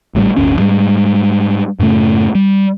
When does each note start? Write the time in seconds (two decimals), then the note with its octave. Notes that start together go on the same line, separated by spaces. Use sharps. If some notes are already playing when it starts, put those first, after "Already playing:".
0.15 G#1 A2 D#3 G3
0.36 D1 G1 D2 C#4
0.58 G#2 G3 G#3
1.80 F#2 A2 C#3 A3
2.35 G3